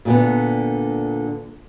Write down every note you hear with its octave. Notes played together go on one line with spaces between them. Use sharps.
A#2 D3 B3